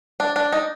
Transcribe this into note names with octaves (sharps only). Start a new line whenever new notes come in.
D4
D4
D#4